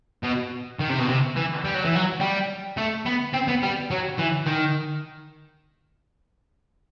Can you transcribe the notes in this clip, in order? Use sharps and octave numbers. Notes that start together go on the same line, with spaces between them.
B2
D#3
C3
B2
C3
E3
G3
F#3
E3
F#3
G3
A3
B3
C4
B3
G3
F#3
E3
D#3